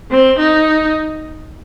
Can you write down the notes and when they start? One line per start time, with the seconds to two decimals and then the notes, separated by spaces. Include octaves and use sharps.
0.11 C4
0.39 D#4